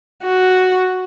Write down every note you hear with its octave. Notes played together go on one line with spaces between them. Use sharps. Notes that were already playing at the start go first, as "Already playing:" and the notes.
F#4